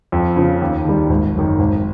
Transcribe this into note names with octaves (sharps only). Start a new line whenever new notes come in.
F2
C#3 F3
D#2
D#3 G3
G#1
F#2 D#3
G#1